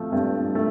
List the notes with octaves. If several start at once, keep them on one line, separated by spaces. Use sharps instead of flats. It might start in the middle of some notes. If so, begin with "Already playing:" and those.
Already playing: F3 A3
G2
A3